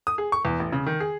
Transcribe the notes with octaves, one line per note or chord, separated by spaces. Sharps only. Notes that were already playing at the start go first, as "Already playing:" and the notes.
D#6
G#4
C#6
E2
A1
C#3
D#3
G#4